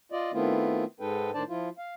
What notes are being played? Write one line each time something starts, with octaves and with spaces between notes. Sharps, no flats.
F4 D5 D#5
D#3 A3 B3 C4 E4 F4
G#2 G#3 D#4 A4 B4 G5
A2 D#3 D4 C5 D5 A5
F3 E4 F4
F5